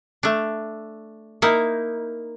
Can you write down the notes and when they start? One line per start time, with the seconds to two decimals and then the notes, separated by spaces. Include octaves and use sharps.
0.23 A3 D4
1.42 A#3 D#4 E4